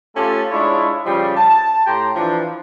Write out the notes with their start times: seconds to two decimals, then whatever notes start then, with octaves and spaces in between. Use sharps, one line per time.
0.16 A3 C#4 F4 G4 A4
0.51 G#3 D4 E4 F4 C#5
1.05 C#3 F3 G3
1.36 A5
1.86 A2 G4 G5 A#5 C6
2.15 E3 F3 D4